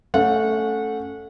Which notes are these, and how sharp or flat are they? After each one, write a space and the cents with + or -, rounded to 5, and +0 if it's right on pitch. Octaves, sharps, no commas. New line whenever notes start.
A3 +0 C#4 +0 F#5 -25